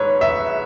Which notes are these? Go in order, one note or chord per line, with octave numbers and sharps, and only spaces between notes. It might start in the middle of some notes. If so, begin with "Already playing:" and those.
Already playing: G#2 B4 C#5
E5